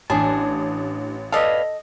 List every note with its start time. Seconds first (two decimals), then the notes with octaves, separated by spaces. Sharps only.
0.10 A1 D4 G#4 A5
1.32 A4 B4 D5 D#5 F5